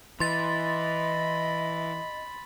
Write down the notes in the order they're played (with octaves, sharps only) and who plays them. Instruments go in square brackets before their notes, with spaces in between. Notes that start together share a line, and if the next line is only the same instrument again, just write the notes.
[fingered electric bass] E3 [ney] D#5 [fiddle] B5 [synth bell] C6 A6